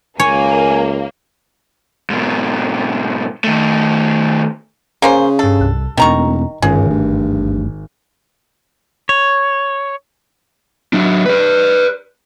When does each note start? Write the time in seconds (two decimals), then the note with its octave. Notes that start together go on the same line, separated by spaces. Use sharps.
0.20 C#2 A#3 C#5 G#5
2.10 G#2 B2
3.44 D#3 A3
5.02 C#3 A#3 C#4 C5
5.39 G2 A4 C7
5.60 C2 F#6
5.97 D1 E2 B2 D#3 A#5 C#6
6.62 G#1 C#2 G2 D3 C#4 G#4
6.90 G1 G2 A3
9.09 C#5
10.93 F#3 D4
11.26 B4 D5